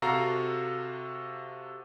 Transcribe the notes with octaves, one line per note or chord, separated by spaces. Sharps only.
C3 F#4 A4 F5 A#5 C7